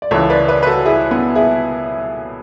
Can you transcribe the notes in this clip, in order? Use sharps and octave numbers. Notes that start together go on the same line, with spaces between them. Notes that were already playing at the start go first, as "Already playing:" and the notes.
D5
C#2 C#3 E3 A4 C#5
B4 D5
B4 D5
B4
F#4 A4
E4 G#4
B3
E4 G#4